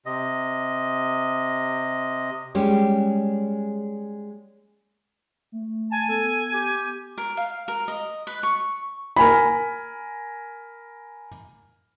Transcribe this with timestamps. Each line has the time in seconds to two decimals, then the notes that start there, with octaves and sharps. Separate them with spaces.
0.06 C3 D#5
2.55 G3 G#3 C#4 G4
5.52 A3
5.91 G#5 A5
6.09 B3 A4
6.54 G4
7.18 A#4
7.37 F5
7.68 A#4
7.88 D#5
8.27 B4
8.43 C#6
9.16 A#4 G#5 B5